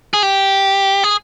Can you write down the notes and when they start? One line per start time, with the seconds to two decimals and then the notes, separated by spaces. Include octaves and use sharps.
0.14 G#4
0.23 G4
1.04 G#4